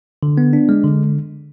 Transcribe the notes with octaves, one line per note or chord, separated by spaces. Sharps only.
D3
B3
D4
G#3
D3